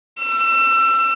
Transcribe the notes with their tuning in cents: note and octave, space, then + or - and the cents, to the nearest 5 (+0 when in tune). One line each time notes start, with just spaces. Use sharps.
E6 +30